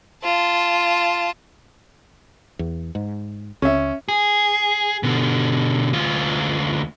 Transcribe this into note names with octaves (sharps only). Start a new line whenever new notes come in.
F4 A5
E2
G#2
C#2 C#4 E5
G#4
B2 D3
D2 F4